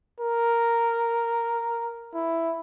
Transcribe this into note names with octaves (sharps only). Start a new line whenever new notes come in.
A#4
E4